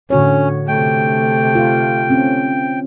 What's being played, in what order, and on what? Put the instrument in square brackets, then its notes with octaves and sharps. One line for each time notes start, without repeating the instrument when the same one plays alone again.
[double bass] A2 [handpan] D3 F#4 C#5 [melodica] C#4
[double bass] C3 A3 [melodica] G5
[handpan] F4
C4 C#4